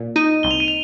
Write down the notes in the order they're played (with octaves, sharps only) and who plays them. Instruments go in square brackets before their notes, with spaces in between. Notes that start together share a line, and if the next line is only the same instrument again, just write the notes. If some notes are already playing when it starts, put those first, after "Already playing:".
Already playing: [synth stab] A#2
[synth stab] D#4 [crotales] D#7
[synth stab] C2 [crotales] G7
[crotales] F7
D#7
F7